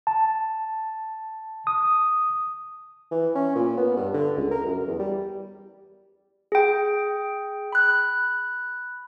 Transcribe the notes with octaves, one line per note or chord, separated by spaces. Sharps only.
A5
D#6
E3
C#4
A#2
B3
G2
D3
C#2
A#4
F#2
E2
G3
G#4 G5
B5 F#6